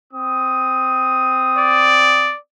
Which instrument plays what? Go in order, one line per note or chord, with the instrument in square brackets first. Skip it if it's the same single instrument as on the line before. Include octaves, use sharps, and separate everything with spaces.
[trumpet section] C4 D#6
[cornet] D5